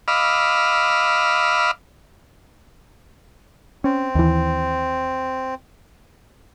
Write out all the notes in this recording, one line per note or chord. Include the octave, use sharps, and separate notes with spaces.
D#5 F5 B5 D6 E6 F6
C4 C#4
D#2 E3